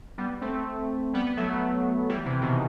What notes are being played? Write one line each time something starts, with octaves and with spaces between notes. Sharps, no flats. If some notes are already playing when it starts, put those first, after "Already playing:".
G3 B3
A3 C4
G3 B3
B3
F#3 A3
E3 G3
C3 E3
B2 D#3